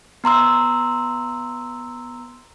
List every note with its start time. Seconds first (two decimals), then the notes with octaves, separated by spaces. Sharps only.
0.24 B3 A#5 C6 E6